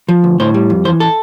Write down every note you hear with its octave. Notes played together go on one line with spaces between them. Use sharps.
F3
D2
A2 C5
G3
F2
E3 C5
A4